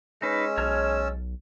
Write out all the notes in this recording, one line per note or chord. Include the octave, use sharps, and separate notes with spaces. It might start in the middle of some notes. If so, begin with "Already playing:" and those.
G#3 C#4 D#4 B4 E6
B1 C#5 A5 F6